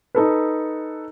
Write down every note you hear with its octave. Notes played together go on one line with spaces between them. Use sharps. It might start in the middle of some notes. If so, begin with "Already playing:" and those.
D#4 A4 B4